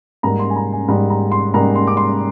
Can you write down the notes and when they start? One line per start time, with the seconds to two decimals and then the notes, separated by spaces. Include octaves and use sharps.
0.23 G#2 G3 A#3 A#5
0.39 C6
0.50 G#5
0.56 A#5
0.72 G#5
0.88 G#2 G3 A#3 A#5
1.10 A#5
1.32 C6
1.54 G#2 G3 A#3 A#5
1.75 C6
1.87 D6
1.97 C6